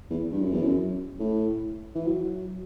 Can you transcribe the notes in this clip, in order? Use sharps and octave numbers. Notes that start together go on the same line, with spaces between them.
E2
G2
F#2
E2
F#2
A2
E3
F#3